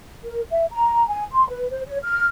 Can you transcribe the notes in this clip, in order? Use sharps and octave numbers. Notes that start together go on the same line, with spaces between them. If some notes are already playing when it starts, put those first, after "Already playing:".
A#4
E5
A#5
G#5
C6
B4
C5
C#5
F6